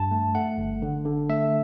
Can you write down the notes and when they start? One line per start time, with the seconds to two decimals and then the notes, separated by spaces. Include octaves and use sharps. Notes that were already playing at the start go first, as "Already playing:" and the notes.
Already playing: G2 A5
0.11 A3
0.35 A3 F#5
0.58 G1
0.82 D3
1.05 D3
1.29 A3 E5